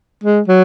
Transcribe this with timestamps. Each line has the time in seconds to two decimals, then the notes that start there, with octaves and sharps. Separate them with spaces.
0.24 G#3
0.48 F#3